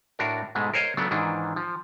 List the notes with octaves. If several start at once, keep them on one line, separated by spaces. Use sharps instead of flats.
A2 D4 F#4 A#4
G#2 B2 G#3 A3
A#4 C5 C#5 D#5 F5
C#3 F#3 A3 B3 D4
G#2 D#3 E3 D4
F3